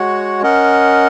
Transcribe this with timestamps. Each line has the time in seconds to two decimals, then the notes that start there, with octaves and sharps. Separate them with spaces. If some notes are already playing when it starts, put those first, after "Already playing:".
Already playing: G#3 F#4 C#5 F#5
0.42 C#4 A#4 D#5 F#5